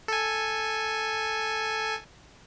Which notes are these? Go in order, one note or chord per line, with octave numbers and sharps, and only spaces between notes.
A4 G#5